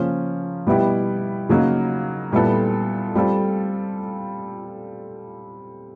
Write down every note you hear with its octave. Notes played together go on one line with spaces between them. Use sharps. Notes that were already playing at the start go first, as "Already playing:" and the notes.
Already playing: C#3 F3 A#3 C#4
B2 G3 B3 E4 G4
C#3 F#3 A#3 D#4
A#2 G3 B3 E4 A4
G3 C4 F4 A4